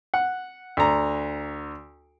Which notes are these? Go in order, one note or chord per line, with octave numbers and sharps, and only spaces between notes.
F#5
D2 A#5